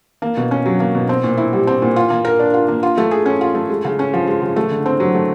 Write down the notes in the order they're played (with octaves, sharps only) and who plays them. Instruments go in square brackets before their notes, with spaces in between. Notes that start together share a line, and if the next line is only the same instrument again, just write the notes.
[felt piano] A#3
B2
C#4
F#3
A#3
B2
C4
A#2
E4
G3
C4
A#2
F4
A#3
A#4
D4
F4
A#3
F4
A3
G#4
C#4
F4
A3
G#3
C#3
C#4
F3
G#3
C#3
A3
D3
C4
F#3
A3